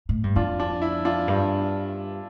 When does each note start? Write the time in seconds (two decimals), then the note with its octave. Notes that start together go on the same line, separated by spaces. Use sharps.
0.09 A2
0.23 G2
0.36 F2 D4 F4
0.60 D4
0.82 E4
1.05 D4 F4
1.27 G2